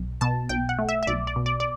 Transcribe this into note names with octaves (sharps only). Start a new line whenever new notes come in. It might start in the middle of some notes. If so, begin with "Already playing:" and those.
Already playing: B1
B2 A5
B1 G5
F#5
A3
E5
E5
B1 D5
D5
B2
D5
D5